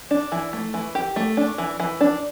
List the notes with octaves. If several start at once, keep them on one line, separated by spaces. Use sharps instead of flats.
D4
E3
A3
E3
G4
A3
D4
E3
E3
D4